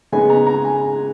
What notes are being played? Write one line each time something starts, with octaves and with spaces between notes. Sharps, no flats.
C#3 G#3 B3 D#4 G#5
A#5
A#5
G#5